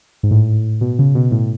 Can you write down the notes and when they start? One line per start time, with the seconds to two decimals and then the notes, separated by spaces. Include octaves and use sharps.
0.23 G#2
0.31 A2
0.81 B2
0.99 C#3
1.15 B2
1.31 A2